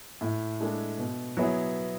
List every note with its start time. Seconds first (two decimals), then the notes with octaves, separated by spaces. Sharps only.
0.21 A2
0.60 G#3 D4 A4
0.98 B2
1.37 F#3 B3 E4 G#4